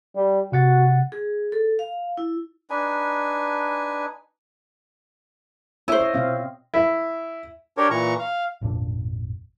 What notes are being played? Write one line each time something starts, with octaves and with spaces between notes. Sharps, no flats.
G3
C3 F#4 F#5 A6
G#4
A4
F5
E4
D4 D#4 B4 G#5
E4 C5 C#5
D#5
B2 C4 F5
E4
D4 G4 A#4 C#5
A#2 E3 A#5 C#6
F5
G#1 F2 A#2 D4